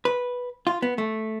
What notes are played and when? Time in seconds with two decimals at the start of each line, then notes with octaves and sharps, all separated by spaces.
0.05 B4
0.67 F4
0.82 B3
0.98 A3